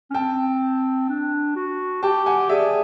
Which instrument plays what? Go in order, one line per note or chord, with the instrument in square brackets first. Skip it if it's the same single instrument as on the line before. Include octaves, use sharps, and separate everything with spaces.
[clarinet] C#4
[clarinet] C4 [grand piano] G5 A5
[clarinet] D4
F#4
[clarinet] G4 [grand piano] G5 A5
[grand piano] F#5 G#5
[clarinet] G#4 [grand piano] D5 E5